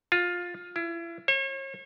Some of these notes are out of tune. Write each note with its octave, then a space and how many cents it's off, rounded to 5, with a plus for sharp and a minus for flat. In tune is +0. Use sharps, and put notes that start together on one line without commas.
F4 +15
E4 +35
C#5 -40